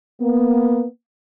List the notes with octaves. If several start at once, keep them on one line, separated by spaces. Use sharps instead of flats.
A#3 B3